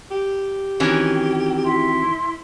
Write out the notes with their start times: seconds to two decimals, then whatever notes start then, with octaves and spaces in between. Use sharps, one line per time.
0.11 G4
0.80 D#3 E3 C4 C#4 F#4
1.64 E4 C6